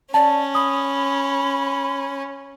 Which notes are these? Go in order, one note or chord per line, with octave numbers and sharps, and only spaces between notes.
C#4 D5 A5
B5 D#6